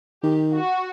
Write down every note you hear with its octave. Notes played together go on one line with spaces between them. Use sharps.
D#3 G4
F#4